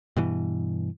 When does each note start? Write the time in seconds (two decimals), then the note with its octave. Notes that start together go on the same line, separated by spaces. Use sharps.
0.16 G2 B2 E3